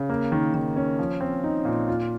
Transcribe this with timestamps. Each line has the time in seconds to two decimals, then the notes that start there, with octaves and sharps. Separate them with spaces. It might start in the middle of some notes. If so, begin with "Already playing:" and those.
Already playing: C#3
0.10 A#3
0.32 D#3
0.54 D#3
0.76 C#4
0.99 F3
1.21 C4
1.44 D#4
1.65 A#2
1.88 F4